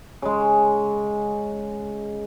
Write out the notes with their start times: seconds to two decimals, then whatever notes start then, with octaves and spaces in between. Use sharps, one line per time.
0.22 C#3 G#3